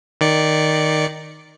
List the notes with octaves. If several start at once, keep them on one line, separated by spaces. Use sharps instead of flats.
D#3 D5 C#7